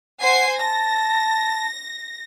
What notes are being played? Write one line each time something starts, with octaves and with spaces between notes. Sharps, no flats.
C5 F#5 G#5 C7
A5 A#6